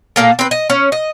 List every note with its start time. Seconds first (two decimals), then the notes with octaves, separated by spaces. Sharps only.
0.16 A#2 G#3 A#3 A4
0.39 C4 B4
0.51 D#5
0.70 C#4
0.92 D#5